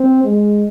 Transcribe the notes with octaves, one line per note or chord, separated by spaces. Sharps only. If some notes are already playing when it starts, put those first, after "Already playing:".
Already playing: C4
G#3